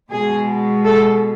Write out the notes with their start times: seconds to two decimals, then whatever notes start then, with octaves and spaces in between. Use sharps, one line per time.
0.10 B2 G#3 G#4
0.85 A4